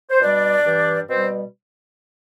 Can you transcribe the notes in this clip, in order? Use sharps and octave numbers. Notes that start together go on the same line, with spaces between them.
C5
B2 G3 D4 D5
G2 E3 G3
B2 G3 C4 C5